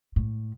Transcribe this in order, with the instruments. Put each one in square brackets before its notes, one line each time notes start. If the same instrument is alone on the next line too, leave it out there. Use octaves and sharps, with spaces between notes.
[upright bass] A2